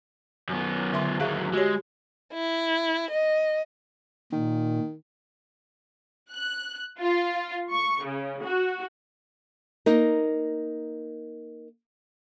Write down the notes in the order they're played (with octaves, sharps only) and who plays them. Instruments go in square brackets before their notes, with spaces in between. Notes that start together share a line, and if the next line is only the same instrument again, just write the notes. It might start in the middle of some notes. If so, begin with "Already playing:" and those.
[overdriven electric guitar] F#2 B3
[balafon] D3 E5 C6
[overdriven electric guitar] D#2 F#3 [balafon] G#4 E5 F5
[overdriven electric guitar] G#3 [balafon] F#4 G4 C#5
[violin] E4
D#5
[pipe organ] A#2 [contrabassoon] D#3
[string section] F#6
F4
C#6
C#3
F#4
[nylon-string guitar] A#3 D#4 A#4